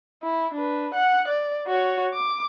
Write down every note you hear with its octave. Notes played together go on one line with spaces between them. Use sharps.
E4
D4 B4
F#5 F#6
D5
F#4 C#5
D6